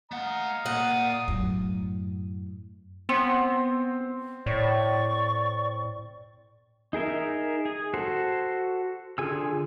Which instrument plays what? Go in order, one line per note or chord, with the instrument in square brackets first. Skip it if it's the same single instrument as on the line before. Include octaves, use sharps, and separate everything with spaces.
[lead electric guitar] A3 F#5 [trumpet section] D#5 F5 A#5
[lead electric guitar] A#2 A#4 [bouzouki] F#5 [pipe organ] D#6
[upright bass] F#2 A2
[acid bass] B3 [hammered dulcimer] C4
[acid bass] A2 [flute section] D5 C#6
[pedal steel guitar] D#4 G#4 A#4 E5
G#4
F#4 A4 C5
D3 F4 G#4 G#5 E6